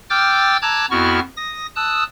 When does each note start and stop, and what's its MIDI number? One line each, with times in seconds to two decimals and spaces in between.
0.10 0.57 79
0.10 0.57 86
0.10 0.57 88
0.10 0.57 89
0.10 0.57 91
0.10 0.57 93
0.62 0.86 81
0.62 0.86 82
0.62 0.86 86
0.62 0.86 88
0.62 0.86 90
0.62 0.86 92
0.91 1.20 41
0.91 1.20 59
0.91 1.20 64
0.91 1.20 66
0.91 1.20 85
0.91 1.20 89
1.37 1.66 87
1.37 1.66 94
1.76 2.04 81
1.76 2.04 87
1.76 2.04 88
1.76 2.04 90